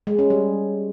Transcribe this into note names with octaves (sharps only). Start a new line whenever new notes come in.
G#3
C#4
G3